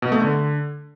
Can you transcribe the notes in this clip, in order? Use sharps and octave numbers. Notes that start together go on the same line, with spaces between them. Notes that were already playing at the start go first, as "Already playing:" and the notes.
B2
A3
D3